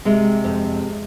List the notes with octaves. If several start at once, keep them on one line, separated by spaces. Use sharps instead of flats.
C3 G#3
F2